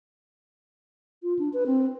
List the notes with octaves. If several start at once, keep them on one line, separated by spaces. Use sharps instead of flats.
F4
D4
B4
C4